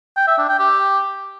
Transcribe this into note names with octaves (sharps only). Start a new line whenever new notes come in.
G5
E5
D4
G5
G4